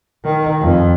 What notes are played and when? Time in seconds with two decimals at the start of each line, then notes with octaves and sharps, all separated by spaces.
0.23 D#3
0.61 F2